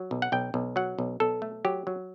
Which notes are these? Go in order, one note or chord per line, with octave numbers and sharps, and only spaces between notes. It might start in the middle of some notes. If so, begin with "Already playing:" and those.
Already playing: F#3
B1
F#5
B1 G5
B1
F#3 F#5
B1
B1 A4
A3
F#3 G4
F#3